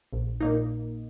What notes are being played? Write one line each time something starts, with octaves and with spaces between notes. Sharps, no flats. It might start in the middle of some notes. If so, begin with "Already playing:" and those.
A#1
A#2 A#3 D#4